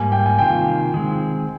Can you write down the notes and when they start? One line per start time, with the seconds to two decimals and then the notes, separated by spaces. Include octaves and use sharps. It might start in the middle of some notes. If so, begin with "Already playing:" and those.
Already playing: G#2 G3 A#3 G#5
0.12 G5
0.26 G#5
0.38 C3 D#3 A#3 F4 G5
0.94 D#3 G#3 C4